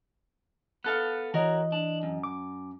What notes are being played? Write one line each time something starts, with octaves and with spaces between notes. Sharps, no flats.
B3 A4 F5 F#6
E3 F#4 A#4 C#5 D#5
D4
F#2
D6